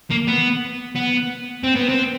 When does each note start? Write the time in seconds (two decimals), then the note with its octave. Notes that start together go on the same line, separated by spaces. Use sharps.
0.10 A#3
0.28 B3
0.95 B3
1.64 C4
1.76 B3
1.89 C4